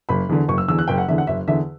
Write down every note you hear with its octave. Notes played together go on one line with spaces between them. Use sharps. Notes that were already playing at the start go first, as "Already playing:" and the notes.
F#1 B5
E2 D3
F#1 C#6
E6
E2 D3 E6
F#6
F#1 G5
F#5
E2 D3 E5
F#5
F#1 E5
E2 D3 E5